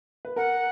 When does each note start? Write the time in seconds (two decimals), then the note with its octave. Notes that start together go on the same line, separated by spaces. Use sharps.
0.25 B4
0.36 A#4 F#5